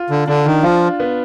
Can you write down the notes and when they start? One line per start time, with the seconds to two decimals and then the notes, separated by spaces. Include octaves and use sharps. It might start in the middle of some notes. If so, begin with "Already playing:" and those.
Already playing: F4
0.10 D3
0.27 D3 D4
0.46 D#3
0.63 F3 F4
1.00 B3